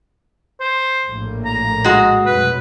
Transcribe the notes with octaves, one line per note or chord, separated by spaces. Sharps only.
C5
A#1 A2 A#3
A#5
G#3 F#4
F1 B2 F#3 B4